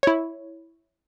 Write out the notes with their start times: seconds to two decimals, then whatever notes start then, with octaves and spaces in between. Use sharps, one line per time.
0.03 E4 C#5